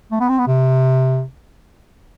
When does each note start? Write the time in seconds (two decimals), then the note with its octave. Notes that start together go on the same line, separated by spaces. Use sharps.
0.12 A3
0.20 B3
0.29 C4
0.39 B3
0.47 C3